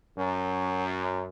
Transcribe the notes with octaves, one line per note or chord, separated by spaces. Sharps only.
F#2